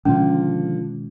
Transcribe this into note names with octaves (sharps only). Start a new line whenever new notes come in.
B2 D3 D#3 F3 G#3 C#4 F4